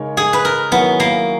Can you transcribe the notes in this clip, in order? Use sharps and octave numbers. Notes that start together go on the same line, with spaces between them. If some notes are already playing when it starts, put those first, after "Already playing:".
Already playing: C#3 G#3 D#4 A#4 C#5
G#4
B4
A#4
D#3 F#3 B3 C#4 E4
A#3